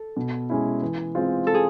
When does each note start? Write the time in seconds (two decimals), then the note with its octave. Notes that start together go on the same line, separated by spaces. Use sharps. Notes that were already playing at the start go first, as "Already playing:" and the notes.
Already playing: A4
0.17 B2
0.50 G#3 C#4 E4
0.82 E3
1.15 G#3 C4 F4
1.47 A4
1.54 G#4